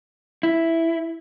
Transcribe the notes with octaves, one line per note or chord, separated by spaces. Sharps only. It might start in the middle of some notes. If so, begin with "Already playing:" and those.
E4